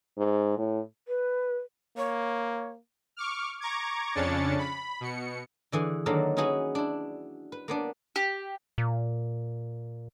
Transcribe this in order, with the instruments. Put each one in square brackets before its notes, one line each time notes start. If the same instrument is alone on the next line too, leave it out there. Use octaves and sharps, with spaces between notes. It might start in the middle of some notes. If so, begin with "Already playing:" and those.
[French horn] G#2
A2
[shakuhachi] B4
[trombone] A#3 [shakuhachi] C#5
[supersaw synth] C#6 D6 F6
A#5 C#6 D6 G#6
F2 C#3 C#4 D4 A6 C#7
B5
B2 C#7
[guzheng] D3 E3 G#4
D3 D#3 F#3 A#3 A4 A#4
C#4 D#4 E4 F#4 G#4 B4
D4 E4
B4
A#3 B3 D4
[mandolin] G4
[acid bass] A#2